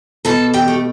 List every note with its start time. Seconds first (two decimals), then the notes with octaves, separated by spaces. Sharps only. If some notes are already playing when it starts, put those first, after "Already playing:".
0.25 B2 A4 A5
0.54 G4 G5
0.68 A3